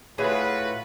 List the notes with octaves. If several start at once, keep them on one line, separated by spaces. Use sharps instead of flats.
A2 F4 F#4 G#4 B4 C#5 E5